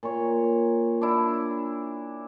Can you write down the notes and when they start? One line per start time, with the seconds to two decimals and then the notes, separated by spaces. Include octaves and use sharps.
0.03 A#2 C#5
1.01 D4 E4